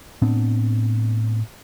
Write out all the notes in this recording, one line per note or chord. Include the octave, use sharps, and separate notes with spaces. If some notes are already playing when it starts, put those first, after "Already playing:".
A2 B3 C4 D4